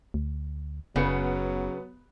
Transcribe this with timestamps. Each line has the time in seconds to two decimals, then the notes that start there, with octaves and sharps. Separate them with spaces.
0.14 D2
0.96 F#1 C#3 F#3 B3 C#7